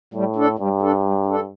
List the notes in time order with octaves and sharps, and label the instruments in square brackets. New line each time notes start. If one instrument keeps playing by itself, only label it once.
[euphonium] A2 [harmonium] G3
[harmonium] D4 A4
[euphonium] G2 [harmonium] G3
[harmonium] D4 A4
G3
D4 A4